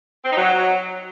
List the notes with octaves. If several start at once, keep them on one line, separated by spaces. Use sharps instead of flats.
C4
D#4
F#3